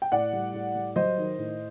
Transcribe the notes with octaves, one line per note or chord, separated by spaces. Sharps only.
G5
A2 D5 F#5
G3
A2
G3
F#3 C5 D#5
D#3
A2